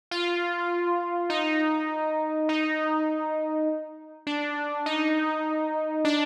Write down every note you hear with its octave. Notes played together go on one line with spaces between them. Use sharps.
F4
D#4
D#4
D4
D#4
D4